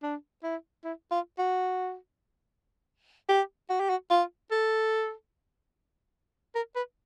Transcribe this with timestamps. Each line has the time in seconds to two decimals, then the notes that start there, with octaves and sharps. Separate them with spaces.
0.03 D4
0.43 E4
0.84 E4
1.11 F4
1.39 F#4
3.29 G4
3.70 F#4
3.80 G4
3.90 F#4
4.10 F4
4.51 A4
6.55 A#4
6.76 B4